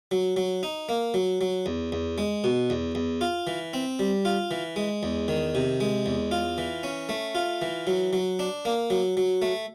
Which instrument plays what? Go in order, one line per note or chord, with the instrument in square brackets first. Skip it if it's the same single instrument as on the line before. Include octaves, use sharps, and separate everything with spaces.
[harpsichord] F#3
F#3
D#4
A#3
F#3
F#3
E2
E2
G#3
B2
E2
E2
F4
E3
C4
G3
F4
E3
G#3
E2
D#3
C3
G#3
E2
F4
E3
C#4
A3
F4
E3
F#3
F#3
D4
A#3
F#3
F#3
A3